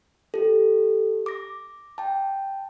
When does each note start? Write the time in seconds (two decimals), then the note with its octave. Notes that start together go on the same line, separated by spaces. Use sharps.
0.34 G4 A4
1.26 D6 A#6
1.98 G5 A5